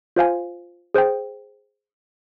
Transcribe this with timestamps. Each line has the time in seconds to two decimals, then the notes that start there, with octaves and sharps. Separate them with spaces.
0.16 F4 C5 F5 G#5
0.94 G#4 C5 G5